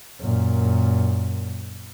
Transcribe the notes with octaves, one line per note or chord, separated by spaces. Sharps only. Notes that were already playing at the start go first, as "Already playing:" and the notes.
F#2 A#2